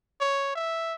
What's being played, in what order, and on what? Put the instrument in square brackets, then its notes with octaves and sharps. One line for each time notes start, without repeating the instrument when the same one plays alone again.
[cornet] C#5
E5